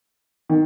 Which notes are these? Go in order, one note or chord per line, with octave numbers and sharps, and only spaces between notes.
D#3